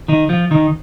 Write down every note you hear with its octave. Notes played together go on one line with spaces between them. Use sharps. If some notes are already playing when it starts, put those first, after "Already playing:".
D#3 D#4
F3 F4
D#3 D#4